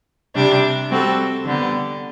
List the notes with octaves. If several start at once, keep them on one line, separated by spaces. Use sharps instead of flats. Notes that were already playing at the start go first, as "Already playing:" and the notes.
C3 G3 D4 G4
G3 C4 F#4 A4
D3 G3 B3